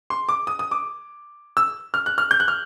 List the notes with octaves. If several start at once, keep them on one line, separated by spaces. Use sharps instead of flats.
C6
D6
D#6
D#6
D6
E6
F6
F#6
F6
G6
F#6
F6